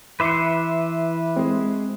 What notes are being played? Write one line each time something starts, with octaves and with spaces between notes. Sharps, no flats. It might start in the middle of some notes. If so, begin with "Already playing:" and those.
E3 B4 E5 C6 D6 C#7
G#3 C4 G#4